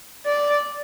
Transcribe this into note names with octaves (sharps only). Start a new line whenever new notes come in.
D5